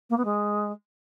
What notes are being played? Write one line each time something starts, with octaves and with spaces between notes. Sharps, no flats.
A#3
B3
G#3